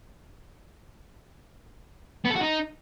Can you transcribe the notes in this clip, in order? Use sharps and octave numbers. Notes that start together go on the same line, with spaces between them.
B3
A4
F#4
D#4